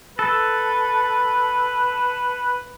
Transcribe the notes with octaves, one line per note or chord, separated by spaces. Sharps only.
A4 B4